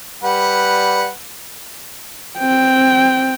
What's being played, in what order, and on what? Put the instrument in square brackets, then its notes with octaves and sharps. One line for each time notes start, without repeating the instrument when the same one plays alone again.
[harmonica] G3 B4 F#5
[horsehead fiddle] C4 G5